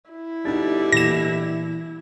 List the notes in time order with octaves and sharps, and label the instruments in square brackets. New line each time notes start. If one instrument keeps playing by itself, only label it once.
[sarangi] E4
[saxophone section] B2 D3 G3 [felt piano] D#4 A6
[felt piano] A#2 E3 [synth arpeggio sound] A#6 E7